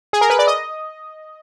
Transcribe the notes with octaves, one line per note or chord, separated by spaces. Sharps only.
G#4
A#4
B4
D5
D#5